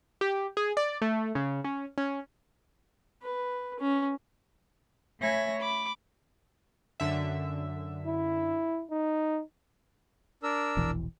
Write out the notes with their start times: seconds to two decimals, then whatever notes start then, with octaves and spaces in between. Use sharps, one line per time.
0.21 G4
0.57 G#4
0.77 D5
1.02 A3
1.35 C#3
1.64 C#4
1.98 C#4
3.23 B4
3.80 C#4
5.20 A3 C#5 E5 G#5 B5 A#6
5.60 B5 D6
7.00 F#2 D3 E5
8.07 E4
8.91 D#4
10.43 D4 A#4 E6
10.77 E1 A#1 E3